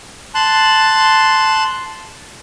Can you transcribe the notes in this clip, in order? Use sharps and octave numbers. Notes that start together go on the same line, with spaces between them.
A5 C6 F#6